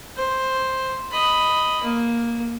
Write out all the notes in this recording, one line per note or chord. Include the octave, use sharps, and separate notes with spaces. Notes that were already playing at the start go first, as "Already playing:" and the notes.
C5
D#5 B5
A#3